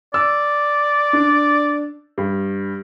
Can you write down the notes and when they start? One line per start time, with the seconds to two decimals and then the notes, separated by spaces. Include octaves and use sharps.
0.14 D5 E6
1.13 D4
2.18 G2